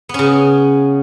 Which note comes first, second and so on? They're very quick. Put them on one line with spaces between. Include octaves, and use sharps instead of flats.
B3 C#4 C#3